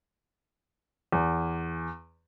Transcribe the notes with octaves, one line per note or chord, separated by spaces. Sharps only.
E2